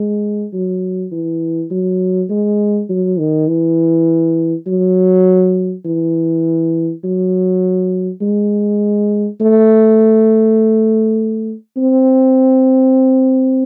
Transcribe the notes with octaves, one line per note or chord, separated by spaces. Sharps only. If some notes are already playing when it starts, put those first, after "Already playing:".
Already playing: G#3
F#3
E3
F#3
G#3
F#3
D#3
E3
F#3
E3
F#3
G#3
A3
C4